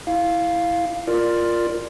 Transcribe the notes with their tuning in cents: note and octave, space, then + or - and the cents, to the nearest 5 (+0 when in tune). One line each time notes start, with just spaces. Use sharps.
E4 +0 F5 +0
F4 +0 A#4 +0 D5 +10